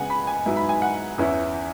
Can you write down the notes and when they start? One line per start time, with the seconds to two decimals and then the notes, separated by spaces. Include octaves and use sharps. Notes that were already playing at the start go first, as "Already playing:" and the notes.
Already playing: C#3 G#3 B3 F#5 G#5
0.10 B5
0.27 G#5
0.46 G#2 F#3 B3 E4
0.56 B5
0.69 G#5
0.82 F#5
1.18 E2 E3 C#4 E4